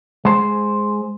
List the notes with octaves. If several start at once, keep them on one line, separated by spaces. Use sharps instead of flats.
G#3 C5